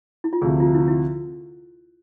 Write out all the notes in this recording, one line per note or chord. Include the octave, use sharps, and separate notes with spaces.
E4
F4
D2 C3 F3 G#4
F4
E4
F4
E4